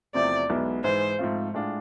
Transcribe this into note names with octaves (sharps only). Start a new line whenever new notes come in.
E2 C3 F3 A3 C4 D5
B1 B2 G#3 B3 E4
G#2 E3 G#3 C5
G#2 F3 A3 C4 F4
A2 G#3 D4 F4